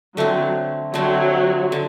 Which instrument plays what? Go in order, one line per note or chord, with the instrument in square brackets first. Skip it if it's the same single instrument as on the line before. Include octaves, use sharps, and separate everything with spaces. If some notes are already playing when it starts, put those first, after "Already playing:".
[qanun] D3 A3 C4 [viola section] F#3
[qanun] D3 A3 C4 [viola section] F#3
[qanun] D3